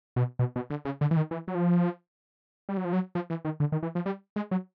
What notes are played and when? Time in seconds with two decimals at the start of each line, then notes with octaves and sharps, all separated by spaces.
0.16 B2
0.39 B2
0.56 B2
0.70 D3
0.85 C#3
1.01 D3
1.11 E3
1.17 D#3
1.31 E3
1.48 F#3
1.55 F3
2.69 G3
2.77 F#3
2.85 F3
2.93 F#3
3.15 F3
3.30 E3
3.45 D#3
3.60 D3
3.72 D#3
3.83 E3
3.95 F3
4.06 G3
4.36 G#3
4.51 F#3